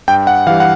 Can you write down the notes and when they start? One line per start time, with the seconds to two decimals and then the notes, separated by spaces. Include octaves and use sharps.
0.08 G2 G5
0.27 F#5
0.47 E3 F5
0.50 G3
0.60 F#5